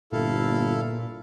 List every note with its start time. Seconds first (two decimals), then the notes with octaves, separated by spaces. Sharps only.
0.12 G1 A#2 E4 A4 F5